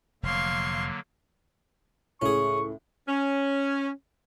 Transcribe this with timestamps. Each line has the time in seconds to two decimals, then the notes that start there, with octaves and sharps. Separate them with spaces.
0.23 F1 D3 F#3 A#3 F5 C6 C#6
2.22 C#2 A2 C#4 G#4 C#6
3.08 C#4